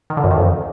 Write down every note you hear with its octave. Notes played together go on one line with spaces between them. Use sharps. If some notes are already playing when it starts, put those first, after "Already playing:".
D#3
D3
F#2
D#3
F2